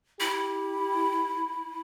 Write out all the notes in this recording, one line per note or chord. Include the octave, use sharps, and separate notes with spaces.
E4 G4